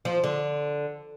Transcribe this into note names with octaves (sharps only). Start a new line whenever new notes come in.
F3
D3